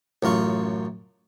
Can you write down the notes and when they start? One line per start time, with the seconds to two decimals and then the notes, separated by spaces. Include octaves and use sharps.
0.23 A1 F#2 F4 C#6